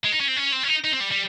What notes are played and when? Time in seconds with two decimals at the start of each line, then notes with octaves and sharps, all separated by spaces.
0.04 G#3
0.12 D#4
0.20 C#4
0.28 C4
0.36 C#4
0.52 C4
0.63 C#4
0.68 D#4
0.84 D#4
0.93 C4
1.01 G3
1.12 G3